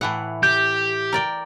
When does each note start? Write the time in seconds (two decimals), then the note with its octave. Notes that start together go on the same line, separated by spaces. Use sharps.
0.01 A2 E3 F#5
0.43 G4 G6
1.12 A#4 D5 G5